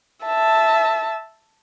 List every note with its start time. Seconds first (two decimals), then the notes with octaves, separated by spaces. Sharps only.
0.25 E5 A5